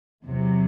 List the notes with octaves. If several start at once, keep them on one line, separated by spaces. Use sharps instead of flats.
E2 C3 F#3